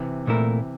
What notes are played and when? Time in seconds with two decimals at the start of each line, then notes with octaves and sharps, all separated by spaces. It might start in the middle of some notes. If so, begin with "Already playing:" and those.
Already playing: C3 E3
0.27 A#2 A3 E4 A#4